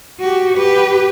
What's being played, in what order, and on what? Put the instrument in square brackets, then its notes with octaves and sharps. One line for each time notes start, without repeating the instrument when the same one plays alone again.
[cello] F#4 G4
G4 B4